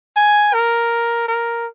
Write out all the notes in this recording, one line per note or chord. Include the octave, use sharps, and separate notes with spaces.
G#5
A#4
A#4